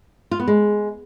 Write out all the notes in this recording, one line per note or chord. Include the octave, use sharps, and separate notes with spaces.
F4
B3
G#3